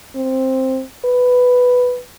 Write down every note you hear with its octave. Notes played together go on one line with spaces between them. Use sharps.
C4
B4